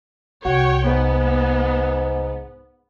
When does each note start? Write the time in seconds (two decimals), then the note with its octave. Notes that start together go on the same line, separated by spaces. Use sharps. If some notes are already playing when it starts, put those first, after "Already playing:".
0.45 C2 F#4 C#5 G5
0.86 G#2 B3